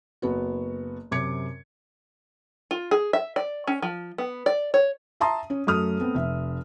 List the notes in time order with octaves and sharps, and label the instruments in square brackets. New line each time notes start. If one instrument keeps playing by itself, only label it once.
[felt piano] F#1 B3 F#4
F#2 C3 D6 G#6 C#7
[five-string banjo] F4
G#4
E5
D5
C#4
F3
B3
D5
C#5
[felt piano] E5 A5 A#5 C6 D#6
C#4
F#2 A3 D#6 F6
A3 B3 C4
F1 E5